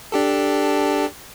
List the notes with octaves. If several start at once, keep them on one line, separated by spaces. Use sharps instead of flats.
D4 G4 A4